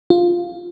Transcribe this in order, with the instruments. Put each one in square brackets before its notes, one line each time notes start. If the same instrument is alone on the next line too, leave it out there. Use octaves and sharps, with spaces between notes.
[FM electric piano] F4